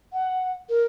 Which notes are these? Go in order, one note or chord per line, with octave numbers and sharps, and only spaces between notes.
F#5
A#4